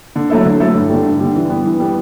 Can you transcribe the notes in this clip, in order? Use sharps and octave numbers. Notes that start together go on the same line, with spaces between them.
D3
F#3 A3 E4 A4
D3
F#3 A3 E4 A4
G2
D3 G3
G2
D3 G3
E3
G3 B3
E3
G3 B3